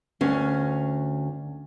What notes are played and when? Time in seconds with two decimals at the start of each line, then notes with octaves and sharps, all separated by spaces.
0.21 D2 C#4